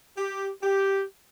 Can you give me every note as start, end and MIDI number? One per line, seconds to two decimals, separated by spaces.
0.17 0.50 67
0.62 1.03 67